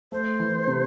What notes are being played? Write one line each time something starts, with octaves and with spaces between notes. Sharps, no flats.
A3 C5
E3
C3